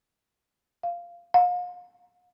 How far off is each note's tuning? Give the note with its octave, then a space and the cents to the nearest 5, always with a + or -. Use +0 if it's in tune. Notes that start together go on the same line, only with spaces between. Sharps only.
F5 -10
F5 +40